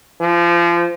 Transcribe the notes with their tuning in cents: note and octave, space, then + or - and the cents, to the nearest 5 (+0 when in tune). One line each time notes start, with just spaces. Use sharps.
F3 -25